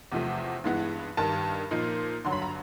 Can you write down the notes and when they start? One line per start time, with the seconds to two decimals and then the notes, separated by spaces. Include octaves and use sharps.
0.12 E2 C3 F3 A3
0.64 G2 E3 G#3 B3
1.17 G2 D#3 G3 A5
1.71 A#2 F3 A#3 D#4
2.24 G2 D3 F#3 C6
2.32 B5
2.42 A#5